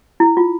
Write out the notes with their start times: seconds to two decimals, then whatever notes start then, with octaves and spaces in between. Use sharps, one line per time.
0.20 E4
0.37 F4